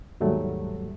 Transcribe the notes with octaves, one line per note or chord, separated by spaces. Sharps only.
D#2 G#2 F#3 G3 A3